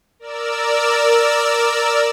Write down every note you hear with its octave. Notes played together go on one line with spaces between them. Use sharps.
A#4 D5 E6